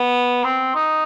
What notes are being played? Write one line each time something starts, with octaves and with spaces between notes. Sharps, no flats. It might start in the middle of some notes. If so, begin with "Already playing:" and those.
Already playing: B3
C4
D#4